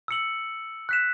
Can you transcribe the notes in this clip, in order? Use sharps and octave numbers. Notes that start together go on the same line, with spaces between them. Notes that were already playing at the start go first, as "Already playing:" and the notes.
E6 C#7 F#7
F#6 B6 E7